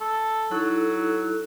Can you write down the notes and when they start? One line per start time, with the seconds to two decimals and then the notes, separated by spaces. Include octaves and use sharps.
0.01 A4
0.51 F#3 D#4 E4 A4